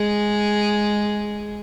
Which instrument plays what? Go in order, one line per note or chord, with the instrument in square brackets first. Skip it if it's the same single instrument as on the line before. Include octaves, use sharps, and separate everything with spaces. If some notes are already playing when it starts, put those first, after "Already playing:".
Already playing: [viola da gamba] G#3 G#4